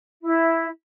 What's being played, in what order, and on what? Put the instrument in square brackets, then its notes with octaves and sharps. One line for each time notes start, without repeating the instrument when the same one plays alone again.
[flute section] E4